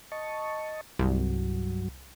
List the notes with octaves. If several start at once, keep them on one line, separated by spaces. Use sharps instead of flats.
D#5 A5 C#6
C2 G2 F#3